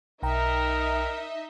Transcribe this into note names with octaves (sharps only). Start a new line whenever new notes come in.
B1 D#4 A#4 D#5 E5 G5 A#5